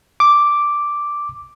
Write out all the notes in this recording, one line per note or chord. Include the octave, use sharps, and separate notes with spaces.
D6